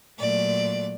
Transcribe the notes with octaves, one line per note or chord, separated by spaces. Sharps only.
A#2 F#3 A3 D5